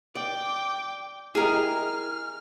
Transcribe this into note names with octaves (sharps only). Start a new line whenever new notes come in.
D5 G5 D6
E4 G4 G#4 A#4 D#5 F6